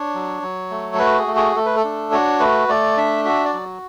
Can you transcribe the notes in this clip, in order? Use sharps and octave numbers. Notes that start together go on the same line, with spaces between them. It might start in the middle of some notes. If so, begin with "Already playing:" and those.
Already playing: D4 C#5
F#3
F#3
A3
A4
F#4 B4
G#4
A3
G#4
A3 A4
B4
A4
D4
F#4 C#5
A3 B4
A3 D5
D4 E5
F#4 E5
D5
F#3